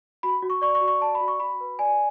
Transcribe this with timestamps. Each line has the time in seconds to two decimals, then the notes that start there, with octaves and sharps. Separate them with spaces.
0.23 F#4 B5
0.42 F#4
0.50 C#6
0.62 D5 C#6
0.75 C#6
0.81 F#4
0.88 C#6
1.01 D5 A5
1.15 B5
1.21 F#4
1.28 C#6
1.40 F#4 B5
1.60 B4
1.79 D5 G#5